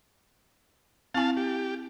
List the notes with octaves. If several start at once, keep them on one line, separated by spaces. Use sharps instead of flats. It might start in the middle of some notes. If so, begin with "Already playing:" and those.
C4 E4 F5 G#5 A5
G4